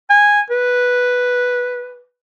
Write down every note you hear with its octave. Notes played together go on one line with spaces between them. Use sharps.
G#5
B4